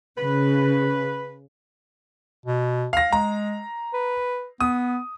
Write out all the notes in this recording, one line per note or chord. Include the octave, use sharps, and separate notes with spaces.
C#3 B4
B2
F5 A#6
G#3 A#5
B4
B3 D#6